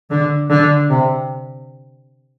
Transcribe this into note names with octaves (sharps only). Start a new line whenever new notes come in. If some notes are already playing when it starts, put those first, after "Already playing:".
D3
D3
C3